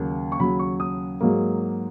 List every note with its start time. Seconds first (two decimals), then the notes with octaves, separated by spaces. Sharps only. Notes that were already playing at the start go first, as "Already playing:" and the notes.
Already playing: D#2 C#3 F#3 A#3
0.32 C#6
0.39 D#2 C#3 F#3 B5
0.59 C#6
0.80 D#6
1.21 G#2 F#3 A#3